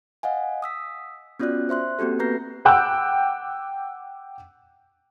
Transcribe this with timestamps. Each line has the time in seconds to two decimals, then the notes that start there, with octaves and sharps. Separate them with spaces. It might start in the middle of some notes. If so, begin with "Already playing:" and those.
0.23 D#5 F5 F#5 G#5
0.62 D#6 E6 B6
1.40 B3 C#4 F4 F#4 D5 F#6
1.69 C5 E5 C6 F#6
1.99 A#3 C4 F#4 G4 A4
2.19 B3 B4 A#5 G6 A#6 C7
2.65 F#5 G5 D6 E6 F#6 G6